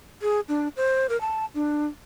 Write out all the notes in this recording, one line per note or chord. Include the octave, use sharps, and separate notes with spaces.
G#4
D4
C5
A#4
A5
D4